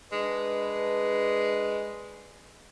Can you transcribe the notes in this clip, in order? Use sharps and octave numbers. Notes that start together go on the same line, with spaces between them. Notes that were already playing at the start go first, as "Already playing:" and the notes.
G#3 D4 B4